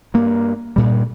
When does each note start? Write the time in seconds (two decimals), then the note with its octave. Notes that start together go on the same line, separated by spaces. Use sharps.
0.14 G2 A#3
0.76 G2 A#2 G3